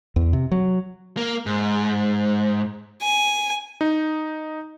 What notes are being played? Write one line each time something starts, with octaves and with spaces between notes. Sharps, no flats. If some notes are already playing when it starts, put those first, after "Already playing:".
E2
C3
F#3
A#3
G#2
G#5
D#4